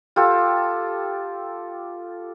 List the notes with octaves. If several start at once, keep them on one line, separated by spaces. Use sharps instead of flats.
F4 G4 A4